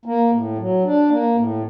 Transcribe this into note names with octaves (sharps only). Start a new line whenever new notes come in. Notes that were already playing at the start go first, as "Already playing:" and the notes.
A#3
A2
F#3
D4
A#3
A2